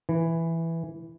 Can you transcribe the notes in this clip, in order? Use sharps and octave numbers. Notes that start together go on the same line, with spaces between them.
E3